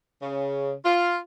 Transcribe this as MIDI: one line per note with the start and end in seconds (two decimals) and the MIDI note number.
0.22 0.73 49
0.85 1.18 65